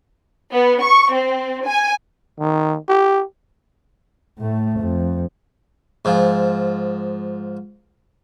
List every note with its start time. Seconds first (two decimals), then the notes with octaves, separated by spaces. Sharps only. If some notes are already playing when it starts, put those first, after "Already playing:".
0.51 B3
0.82 C#6
1.12 C4
1.66 G#5
2.39 D#3
2.89 G4
4.39 A2 A3
4.80 F2
6.05 G#2 F3